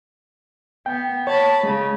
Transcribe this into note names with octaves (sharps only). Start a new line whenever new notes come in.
B3 G5
C#5 A5 B5
C#3 G#3